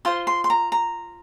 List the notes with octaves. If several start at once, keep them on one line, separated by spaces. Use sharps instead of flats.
F4 C5 C6
C6
C6
A#5
A#5